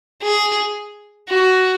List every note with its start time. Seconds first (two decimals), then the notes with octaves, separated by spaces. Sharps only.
0.22 G#4
1.29 F#4